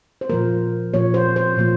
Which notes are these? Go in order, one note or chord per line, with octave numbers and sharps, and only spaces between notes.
C5
A#2 F3 A#3 A#4
A#2 F3 A#3 C#5
C5
C5
A#2 F3 A#3